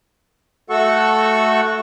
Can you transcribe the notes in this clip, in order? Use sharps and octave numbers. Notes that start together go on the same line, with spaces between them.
A3 F#4 A4 F#5 C#6 E6